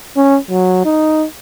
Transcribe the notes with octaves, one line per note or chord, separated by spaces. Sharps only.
C#4
F#3
D#4